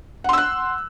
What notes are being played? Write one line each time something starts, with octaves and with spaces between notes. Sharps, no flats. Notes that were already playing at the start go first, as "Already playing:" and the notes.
F#5 C6 E6 F#6